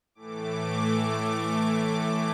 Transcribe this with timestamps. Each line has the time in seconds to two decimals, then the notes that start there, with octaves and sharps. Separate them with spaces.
0.15 A2 E3 A3 D6
1.95 D6